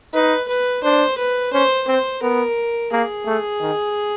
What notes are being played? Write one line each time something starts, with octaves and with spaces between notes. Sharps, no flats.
D#4 B4
B4
D4 C5
B4
C#4 C5
C4 C5
B3 A#4
A#3 G#4
A3
D#3